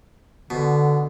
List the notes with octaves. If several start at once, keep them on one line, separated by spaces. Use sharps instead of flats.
B2 D3